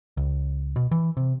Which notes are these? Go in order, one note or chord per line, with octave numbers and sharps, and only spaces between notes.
C#2
B2
E3
C3